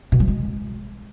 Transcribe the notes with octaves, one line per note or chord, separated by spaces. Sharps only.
B2
F#3
G#3